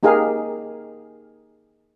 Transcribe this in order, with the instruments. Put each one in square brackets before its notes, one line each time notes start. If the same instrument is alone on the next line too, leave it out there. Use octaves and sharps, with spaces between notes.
[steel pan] A#3 D#4 G4 G#4 A#4 F5